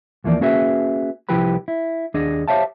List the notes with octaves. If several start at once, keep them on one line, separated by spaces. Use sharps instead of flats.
D#2 E3 F3 A#3 D5
A#3 C#4 F#4 G#4 B4 E5
C2 F3 E4 G4 B4 B5
E4
D#2 D4 G#4 D#5
G4 C5 C#5 E5 F5 A5